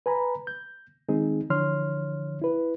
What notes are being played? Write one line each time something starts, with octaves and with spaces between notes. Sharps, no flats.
B4 G#5 A#5 B5
G6
D#3 G#3 C4 D#4 G#4
D3 E3 F3 C#5 C6 F6
E4 B4